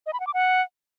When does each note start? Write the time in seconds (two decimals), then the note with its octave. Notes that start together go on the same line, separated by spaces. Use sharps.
0.06 D#5
0.13 B5
0.20 F#5
0.27 D6
0.34 F#5